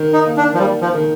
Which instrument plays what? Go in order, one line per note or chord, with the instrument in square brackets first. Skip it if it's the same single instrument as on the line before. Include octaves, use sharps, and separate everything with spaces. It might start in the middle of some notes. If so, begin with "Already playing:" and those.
Already playing: [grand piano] D#3
[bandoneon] D#4
[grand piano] A#3
[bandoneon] D4
F3
[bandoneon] G3 [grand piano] A#3
[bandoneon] F3
[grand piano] D#3